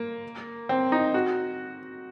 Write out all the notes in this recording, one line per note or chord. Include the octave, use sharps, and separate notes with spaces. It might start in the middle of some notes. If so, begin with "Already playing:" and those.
Already playing: A#3
C4
D#4
F#4